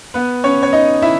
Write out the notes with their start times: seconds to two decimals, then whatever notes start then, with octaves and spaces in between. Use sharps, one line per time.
0.14 B3 B4
0.44 C#4 C#5
0.63 C#5
0.73 D#4 D#5
1.02 E4 E5